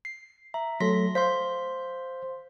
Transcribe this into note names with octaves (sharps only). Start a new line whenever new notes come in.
C7
E5 A#5
F#3 A3 A4 C6 A#6 B6
C5 F5 C6 G6 B6